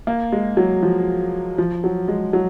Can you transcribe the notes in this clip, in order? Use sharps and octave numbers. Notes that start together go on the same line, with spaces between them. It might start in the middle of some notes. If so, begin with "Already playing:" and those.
A#3
G#3
F#3
F3
F3
F#3
G#3
F#3